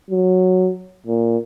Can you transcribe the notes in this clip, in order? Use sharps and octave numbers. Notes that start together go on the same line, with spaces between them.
F#3
A#2